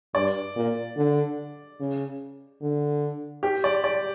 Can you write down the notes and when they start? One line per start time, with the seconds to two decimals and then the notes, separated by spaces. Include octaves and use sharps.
0.15 G2 D5
0.56 A#2
0.96 D3
1.80 C#3
2.62 D3
3.43 G4
3.64 D5
3.84 D5